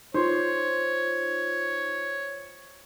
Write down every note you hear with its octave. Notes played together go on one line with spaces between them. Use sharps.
D#4 F4 C5 C#5